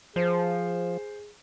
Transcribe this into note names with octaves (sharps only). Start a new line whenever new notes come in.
F3 G#4 C5